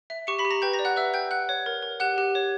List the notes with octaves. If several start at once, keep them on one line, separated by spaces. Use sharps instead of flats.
E5
G4 C#6 C#7
B5 B6
G4
A#5 A#6
B4 G5 G6
A#5 A#6
D5
F#5 F#6
B4 E5 E6
G5 G6
F#5 F#6
C#5
A#4
A#4
G4 F#5 F#6
G4
C#5